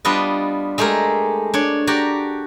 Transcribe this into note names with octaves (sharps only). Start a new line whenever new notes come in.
G3 B3 D4 F4 B4 D#5
G#3 A3 G4 G#4 A#4
D4 C#5
F#4 G4 D5 A#5